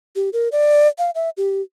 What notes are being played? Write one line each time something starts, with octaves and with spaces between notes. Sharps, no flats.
G4
A#4
D5
F5
E5
G4